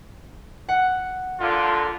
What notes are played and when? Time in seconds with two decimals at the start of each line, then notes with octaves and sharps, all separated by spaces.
0.69 F#5
1.40 A#2 D3 F4